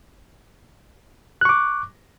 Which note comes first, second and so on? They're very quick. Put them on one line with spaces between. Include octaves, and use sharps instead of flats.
F#6 C#6 D6